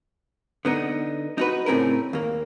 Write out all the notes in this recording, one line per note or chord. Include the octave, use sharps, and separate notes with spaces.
D3 B3 D#4
D#4 F#4 B4
C#2 A2 C4 C#4 A#4
D#2 A#3